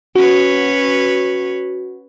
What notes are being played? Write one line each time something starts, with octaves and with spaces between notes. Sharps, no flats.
C#4 F#4 B4 C#5